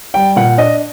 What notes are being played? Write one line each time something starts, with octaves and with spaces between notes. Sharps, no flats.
G3 G5
A#2 F#5
D4 D#5